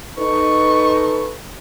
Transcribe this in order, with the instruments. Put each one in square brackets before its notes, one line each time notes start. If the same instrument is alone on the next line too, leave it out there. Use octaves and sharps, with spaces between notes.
[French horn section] D#4 A4 B4 [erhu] C#6